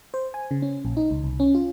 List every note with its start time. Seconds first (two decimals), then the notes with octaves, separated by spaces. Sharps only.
0.14 C5
0.34 G#5
0.51 C#3
0.62 C#4
0.85 A#1
0.97 D#4
1.11 C#2
1.24 C2
1.40 C#4
1.55 F4